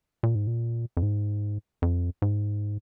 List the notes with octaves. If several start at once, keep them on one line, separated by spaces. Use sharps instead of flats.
A#2
G#2
A#2
F2
G#2
F2
G#2